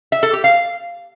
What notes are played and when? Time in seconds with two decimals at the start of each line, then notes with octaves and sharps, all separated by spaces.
0.12 E5
0.23 A4
0.33 G4
0.44 F5